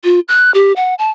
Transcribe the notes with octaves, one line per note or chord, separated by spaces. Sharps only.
F4
F#6
G4
F#5
A5